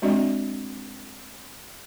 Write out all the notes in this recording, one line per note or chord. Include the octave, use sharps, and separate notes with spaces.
G#3 C4 D4 F#4 D5 D#5